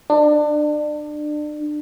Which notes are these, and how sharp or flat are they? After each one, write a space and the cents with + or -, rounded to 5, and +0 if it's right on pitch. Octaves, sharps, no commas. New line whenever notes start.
D4 +30